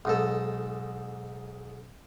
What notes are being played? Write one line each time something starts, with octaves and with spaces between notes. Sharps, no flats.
B1 G#2 A4